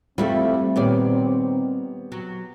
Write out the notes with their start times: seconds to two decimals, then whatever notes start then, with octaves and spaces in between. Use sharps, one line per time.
0.18 F2 G3 A3 C4 E4 F4 G4
0.76 A#2 D#3 B3 G4 C#5 D5
2.12 F#3